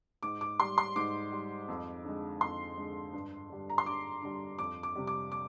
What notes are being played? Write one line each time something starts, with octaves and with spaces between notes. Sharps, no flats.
G#2 D6
D6
G3 C6
C6
G#2 D6
G3
F2
D3 G#3
F2 C6
D3 G#3
G2
D3 G3
A#5
C6
G2 D6
D3 G3
F2 D6
D6
C3 G3
D6
D6